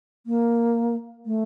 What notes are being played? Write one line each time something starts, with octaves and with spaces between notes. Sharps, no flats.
A#3
A3